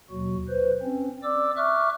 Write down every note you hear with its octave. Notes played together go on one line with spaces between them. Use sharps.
D#2 B2 F#3 F#4
B4 C5
C4 C#4
D5 D6 E6
E5 C#6 D6 F6 F#6